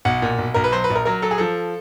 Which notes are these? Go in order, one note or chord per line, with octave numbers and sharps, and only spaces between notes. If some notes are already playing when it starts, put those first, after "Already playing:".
B1 F#5
A#2
B1
B1 A#4
B4
F#3 C5
B4
A#1
A#4
F#3 A#4
F#3 A4
G#4
F3 A4